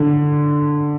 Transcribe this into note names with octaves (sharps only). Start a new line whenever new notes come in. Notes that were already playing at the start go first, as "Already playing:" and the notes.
Already playing: D3